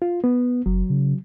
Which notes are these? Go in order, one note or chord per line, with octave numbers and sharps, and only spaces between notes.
F4
B3
F#1 F#3
C#3